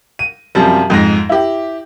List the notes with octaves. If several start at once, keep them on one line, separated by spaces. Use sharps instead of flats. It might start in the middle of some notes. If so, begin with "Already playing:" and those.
D#7
F#2 C3 F3 G3
F2 G#2 A#6
E4 G4